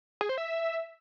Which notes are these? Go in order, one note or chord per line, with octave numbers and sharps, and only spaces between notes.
G#4
C5
E5